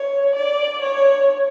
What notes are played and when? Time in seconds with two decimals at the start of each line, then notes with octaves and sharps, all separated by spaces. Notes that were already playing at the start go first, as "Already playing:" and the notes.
Already playing: C#5
0.35 D5
0.82 C#5